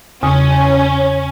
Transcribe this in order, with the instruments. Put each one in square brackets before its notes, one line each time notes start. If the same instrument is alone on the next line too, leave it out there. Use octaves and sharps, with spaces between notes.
[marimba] E2 C#3 D#6 [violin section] C#4